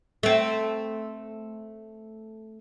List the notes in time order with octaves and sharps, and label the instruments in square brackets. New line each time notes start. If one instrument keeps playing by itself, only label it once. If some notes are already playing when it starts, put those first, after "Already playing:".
[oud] A3 C4